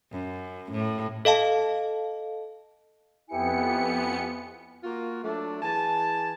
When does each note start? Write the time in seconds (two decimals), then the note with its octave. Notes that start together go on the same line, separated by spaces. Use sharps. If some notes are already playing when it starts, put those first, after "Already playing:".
0.11 F#2
0.71 A2
1.25 A4 D#5 F5 A5
3.29 F2 B3 E4 G4 G#5 C#7
4.84 A#3 F4 F#4
5.24 F#3 A3 D4
5.63 E3 G#4 G#5 A5